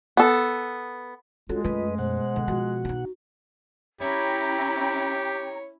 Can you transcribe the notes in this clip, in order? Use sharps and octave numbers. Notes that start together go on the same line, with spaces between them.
B3 A4
G#3 C#4 F4 F#4 A4
F#2 A3 B4 D#5
B2 C5 F#5
D3
F3 F#4
D4 D#4
C#4 E4 G4 C#5 G5 A#5